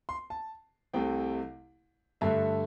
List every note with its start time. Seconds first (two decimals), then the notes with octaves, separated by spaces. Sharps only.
0.09 C6
0.30 A5
0.94 C2 C3 A3 G5
2.21 G2 D3 A3 E5